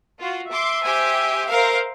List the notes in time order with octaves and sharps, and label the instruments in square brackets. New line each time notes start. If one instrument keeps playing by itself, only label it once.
[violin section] F4 F#4
[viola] E5 [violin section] C6 D6
[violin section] G4 C5 G#5
A#4 C5 F5